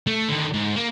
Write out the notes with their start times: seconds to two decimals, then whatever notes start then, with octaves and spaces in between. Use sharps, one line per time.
0.07 A3
0.29 D3 D#3
0.54 G#2
0.76 A#3